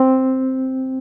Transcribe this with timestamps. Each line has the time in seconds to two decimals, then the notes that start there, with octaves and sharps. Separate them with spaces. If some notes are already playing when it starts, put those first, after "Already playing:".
Already playing: C4